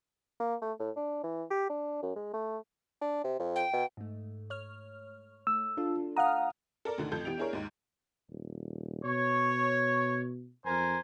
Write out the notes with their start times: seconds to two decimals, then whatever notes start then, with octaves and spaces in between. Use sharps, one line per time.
0.40 A#3
0.62 A3
0.80 A2
0.96 D4
1.23 E3
1.50 G4
1.69 D4
2.03 F#2
2.16 G#3
2.34 A3
3.01 D4
3.24 C3
3.39 F2
3.56 G5
3.73 B2
3.97 G#2 A3
4.50 C#5 F6
5.47 A3 E6
5.77 D4 F4 A4
6.17 F5 F#5 A#5 D#6 F6
6.85 A4 A#4 D5
6.98 D2 D3 D#3
7.12 A1 F2 A4 G6 G#6
7.25 E3 B3 G4 D7 F7
7.38 D4 E4 G#4 A#4 C#5
7.53 D#2 G#2
8.30 D#1
9.04 B2 C#5
10.65 F2 A#4 C5 G#5